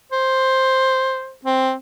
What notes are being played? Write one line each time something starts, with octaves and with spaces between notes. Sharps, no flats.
C5
C4